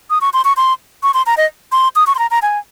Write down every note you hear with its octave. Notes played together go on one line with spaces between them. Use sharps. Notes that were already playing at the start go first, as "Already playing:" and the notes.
D#6
C#6
C6
C#6
C6
C#6
C6
A#5
D#5
C6
D#6
C#6
C6
A#5
A#5
G#5